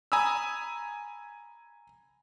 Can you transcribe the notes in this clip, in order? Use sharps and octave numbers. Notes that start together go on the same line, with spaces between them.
G#5 A#5 B5 D#6 E6